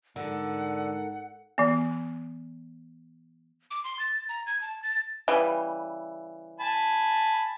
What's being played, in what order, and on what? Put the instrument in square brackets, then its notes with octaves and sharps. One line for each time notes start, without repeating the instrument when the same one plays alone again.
[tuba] G#2 [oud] D3 [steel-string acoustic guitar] A4 A#4 [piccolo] F#5
[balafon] E3 B3
[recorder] D6
C6
A6
A#5
G#6
A5
A6
[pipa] C#3 E3 G3
[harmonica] G#5 A5 B5